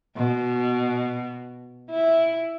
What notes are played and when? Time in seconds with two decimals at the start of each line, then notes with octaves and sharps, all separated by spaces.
0.16 B2
1.90 E4